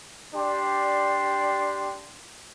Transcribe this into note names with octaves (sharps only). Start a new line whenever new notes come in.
D4 G4 D5 G5 C6